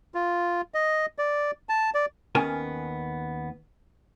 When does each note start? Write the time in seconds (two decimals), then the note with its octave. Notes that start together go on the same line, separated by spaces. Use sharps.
0.15 F4
0.74 D#5
1.18 D5
1.69 A5
1.94 D5
2.35 D#2 B3 C#4 A#4 G#5 A5